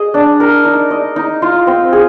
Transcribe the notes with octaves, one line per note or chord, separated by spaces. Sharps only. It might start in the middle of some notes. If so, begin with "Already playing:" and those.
Already playing: G#4 D#5
D4
A#4
D#4
D#5
D#4
F4
C4
G#4